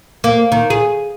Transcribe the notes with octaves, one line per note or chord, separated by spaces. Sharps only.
A#3
D#3
G#4